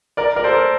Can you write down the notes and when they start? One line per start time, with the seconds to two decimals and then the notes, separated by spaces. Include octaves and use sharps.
0.17 A#4 D5
0.36 A#4 D5
0.44 A4 C5
0.53 A#4 D5